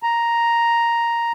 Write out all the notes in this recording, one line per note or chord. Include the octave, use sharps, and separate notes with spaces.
A#5